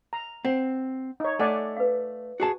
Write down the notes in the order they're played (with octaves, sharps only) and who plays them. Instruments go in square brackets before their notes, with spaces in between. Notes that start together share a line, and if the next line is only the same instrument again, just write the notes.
[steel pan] A#5
[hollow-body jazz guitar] C4 [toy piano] F#5
[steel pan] D#4 C#5
[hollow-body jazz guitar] A3 [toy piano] A4 [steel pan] D5 F#5 G#5
[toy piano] B4 F5
[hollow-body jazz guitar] F#4 G#4 A5